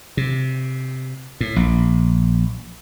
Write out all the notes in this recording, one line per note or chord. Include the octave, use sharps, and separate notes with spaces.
C3
A2
A#1